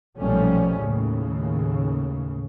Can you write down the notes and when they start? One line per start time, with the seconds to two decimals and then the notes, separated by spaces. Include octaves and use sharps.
0.19 B1 A#2 F3 G3 A3 C#4
0.77 D#2 A2 C#3